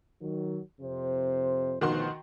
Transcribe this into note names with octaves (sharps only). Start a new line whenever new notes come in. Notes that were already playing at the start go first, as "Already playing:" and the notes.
D#3 F#3
F2 C3 C5
D2 B2 D#3 F3 F#4 C6